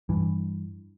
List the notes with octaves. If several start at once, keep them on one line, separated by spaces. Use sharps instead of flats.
G2 E3